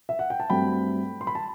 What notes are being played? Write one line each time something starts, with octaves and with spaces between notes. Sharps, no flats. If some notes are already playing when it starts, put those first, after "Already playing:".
E5
F#5
G5
A5
G2 F#3 A3 C4 G5 B5
C6
B5
A5